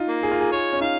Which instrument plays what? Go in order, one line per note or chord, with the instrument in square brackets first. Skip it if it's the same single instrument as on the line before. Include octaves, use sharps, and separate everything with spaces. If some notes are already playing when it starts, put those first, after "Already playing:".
Already playing: [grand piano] D#4 F4
[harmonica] A#3
[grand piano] G#4
F4
G#4
[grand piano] G#4 [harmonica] C#5
[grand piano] C#4
[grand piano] D#4 [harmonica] F5